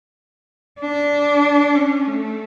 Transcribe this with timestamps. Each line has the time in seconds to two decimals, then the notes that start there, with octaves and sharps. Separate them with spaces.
0.80 D4
1.75 C#4
2.07 A3